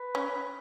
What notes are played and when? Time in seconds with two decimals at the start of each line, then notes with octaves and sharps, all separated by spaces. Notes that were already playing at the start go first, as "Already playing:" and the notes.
Already playing: B4
0.15 C#4